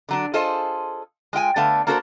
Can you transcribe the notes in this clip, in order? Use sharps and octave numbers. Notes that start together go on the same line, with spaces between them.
D3 F#3 D4
F4 G#4 A4 C5 D#5
G#3 F4 G5 G#5
D3 A3 B3 F5 A5
A#3 D4 F#4 A4 A#4 C5